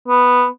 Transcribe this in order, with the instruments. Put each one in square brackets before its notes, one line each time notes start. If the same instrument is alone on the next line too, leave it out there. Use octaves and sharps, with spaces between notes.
[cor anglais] B3